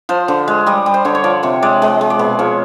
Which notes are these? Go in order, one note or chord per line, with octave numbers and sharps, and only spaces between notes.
F3 C5
D3
G#3
G3 D#5
G3
C5
D3 C#5
C#5
F3 D5
C3 C#5
G#3 D5
G#3 D#5
G#3
D5
B2
F3 C#5